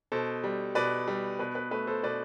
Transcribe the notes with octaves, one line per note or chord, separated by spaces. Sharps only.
B2 A4 C5
G3
B2 B4 D5
G3
B2 B4
B4
A3 B4
A4 C5
B2 B4 D5